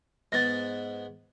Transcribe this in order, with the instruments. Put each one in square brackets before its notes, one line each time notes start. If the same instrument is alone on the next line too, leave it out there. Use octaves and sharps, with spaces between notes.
[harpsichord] G#2 B3 [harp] A6 A#6